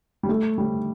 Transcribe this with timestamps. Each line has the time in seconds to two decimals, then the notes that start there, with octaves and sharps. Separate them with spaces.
0.23 G3
0.29 A3
0.58 G3